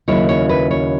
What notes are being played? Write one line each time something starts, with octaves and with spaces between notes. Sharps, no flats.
D#2 C#3 F#3 C#4 E4 C#5
C#5
B4
C#5